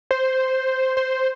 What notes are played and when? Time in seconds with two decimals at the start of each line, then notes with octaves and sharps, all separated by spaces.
0.11 C5
0.97 C5